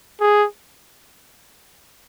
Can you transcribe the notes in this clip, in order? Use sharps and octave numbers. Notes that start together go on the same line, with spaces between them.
G#4